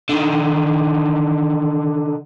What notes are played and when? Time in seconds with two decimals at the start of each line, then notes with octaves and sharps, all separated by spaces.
0.09 D3 D#3